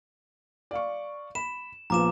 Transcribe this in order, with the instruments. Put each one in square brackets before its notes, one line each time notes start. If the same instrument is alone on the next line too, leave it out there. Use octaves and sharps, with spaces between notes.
[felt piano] D5 F5 C#6
[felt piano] B5 [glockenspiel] E7
[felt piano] A#1 F3 B3 [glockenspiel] A#5 D6 E7